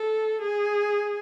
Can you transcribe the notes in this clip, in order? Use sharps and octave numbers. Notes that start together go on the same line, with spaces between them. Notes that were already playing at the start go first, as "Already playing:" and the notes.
Already playing: A4
G#4